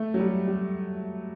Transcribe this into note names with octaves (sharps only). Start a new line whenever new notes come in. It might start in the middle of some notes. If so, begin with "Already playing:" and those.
Already playing: A3
F#3
G3
G3